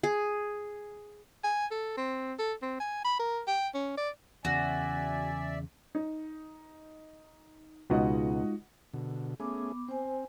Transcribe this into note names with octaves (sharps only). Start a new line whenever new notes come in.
G#4
G#5
A4
C4
A4
C4
G#5
B5
A#4
G5
C#4
D5
E2 C#3 F#4 D5 E5 G#5
D#4
C#2 B2 G#3 D#4 F4 F#4 D#5 F#5
B2 D3
A3 B3 C#4 G#4 D6
C4 C5 G#5